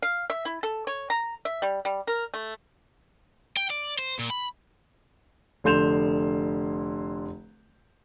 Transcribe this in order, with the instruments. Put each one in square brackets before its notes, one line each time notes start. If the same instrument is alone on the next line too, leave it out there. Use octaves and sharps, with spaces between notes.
[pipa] F5
E5
E4
A4
C#5
A#5
E5
G3
G3
A#4
A3
[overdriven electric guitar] G5
D5
C5
A#2
B5
[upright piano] F1 D3 C6 G6 E7 F7